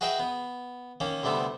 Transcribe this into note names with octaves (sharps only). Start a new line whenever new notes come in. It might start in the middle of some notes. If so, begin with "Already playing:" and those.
F#4 G#4 B4 D#5 E5 G5
B3
D#3 A#3 C#4
D2 C3 G3 A3 B3